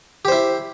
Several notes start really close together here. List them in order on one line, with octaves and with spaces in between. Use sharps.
G4 C5 E4